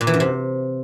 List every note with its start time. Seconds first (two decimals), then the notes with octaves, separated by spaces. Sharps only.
0.01 A#2
0.07 E3
0.14 F#2
0.20 C3